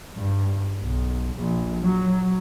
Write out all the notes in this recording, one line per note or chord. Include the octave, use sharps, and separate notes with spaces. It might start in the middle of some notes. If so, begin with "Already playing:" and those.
G2
B1
A#1
F#3